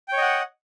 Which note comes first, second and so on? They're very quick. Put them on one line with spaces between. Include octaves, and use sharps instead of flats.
G5 C#5 D#5 F#5